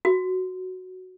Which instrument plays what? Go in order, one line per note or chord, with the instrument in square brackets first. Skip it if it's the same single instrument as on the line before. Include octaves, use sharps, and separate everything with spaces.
[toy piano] F#4